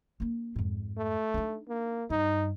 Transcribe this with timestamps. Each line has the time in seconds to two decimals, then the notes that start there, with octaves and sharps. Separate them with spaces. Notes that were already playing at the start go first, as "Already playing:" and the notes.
0.20 A#3 D4
0.56 F2 G#2
0.97 A3
1.34 D4 D#4
1.68 A#3
2.10 G2 D#4